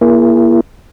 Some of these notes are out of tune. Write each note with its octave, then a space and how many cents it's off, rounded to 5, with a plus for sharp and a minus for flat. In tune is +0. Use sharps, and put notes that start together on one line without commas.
A#3 +30 E4 +30 G#4 +0